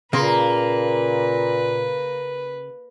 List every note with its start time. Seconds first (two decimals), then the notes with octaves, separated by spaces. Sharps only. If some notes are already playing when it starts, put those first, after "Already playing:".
0.13 A#2 C#3 A#3 A#4 B4 C6